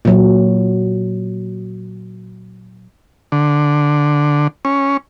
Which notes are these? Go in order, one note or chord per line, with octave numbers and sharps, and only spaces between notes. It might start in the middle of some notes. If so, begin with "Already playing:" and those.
A#2 F#3
D3
C#4